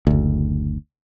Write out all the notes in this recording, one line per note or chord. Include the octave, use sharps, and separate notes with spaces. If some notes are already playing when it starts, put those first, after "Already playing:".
F#1 D2